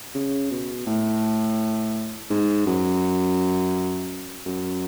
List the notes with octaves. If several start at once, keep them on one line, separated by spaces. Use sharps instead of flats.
C#3
B2
A2
G#2
F#2
F#2